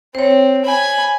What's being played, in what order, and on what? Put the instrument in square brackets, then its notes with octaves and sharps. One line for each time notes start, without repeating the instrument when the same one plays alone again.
[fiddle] C4 [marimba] C5 C#5
[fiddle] G#5 B5